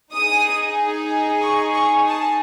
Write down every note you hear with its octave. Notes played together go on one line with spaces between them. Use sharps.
D#4 G#4 D#6
C#6
C#6
A5